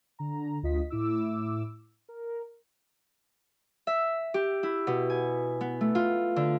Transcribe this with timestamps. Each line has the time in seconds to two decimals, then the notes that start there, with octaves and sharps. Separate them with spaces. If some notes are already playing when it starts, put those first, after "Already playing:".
0.19 D3 A#5
0.63 D2 F4 D#5 B6
0.90 A2 E4 D6 E6
2.09 A#4
3.87 E5
4.34 G4
4.63 E4
4.87 B2
5.10 G#5
5.61 B3
5.81 A3
5.95 F4
6.36 D3